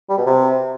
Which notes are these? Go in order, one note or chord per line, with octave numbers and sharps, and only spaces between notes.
G3
B2
C3